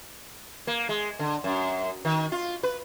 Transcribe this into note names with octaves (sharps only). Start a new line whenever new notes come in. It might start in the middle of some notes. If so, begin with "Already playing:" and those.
A#3
G#3
D3
F#2
D#3
F4
B4